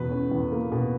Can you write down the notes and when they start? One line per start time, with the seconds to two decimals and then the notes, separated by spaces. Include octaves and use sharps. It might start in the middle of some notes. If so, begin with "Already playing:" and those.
Already playing: E2 B2 B4
0.11 C#4
0.31 E2
0.52 A#3
0.72 B2